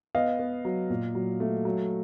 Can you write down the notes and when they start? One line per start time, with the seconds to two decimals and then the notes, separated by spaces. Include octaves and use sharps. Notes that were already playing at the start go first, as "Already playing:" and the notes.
0.15 B3 D#5 F5
0.39 B3
0.65 F#3
0.90 A#2
1.15 F#3
1.40 A3
1.65 F#3